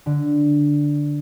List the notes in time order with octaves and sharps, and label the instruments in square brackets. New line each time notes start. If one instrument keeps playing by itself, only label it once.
[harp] D3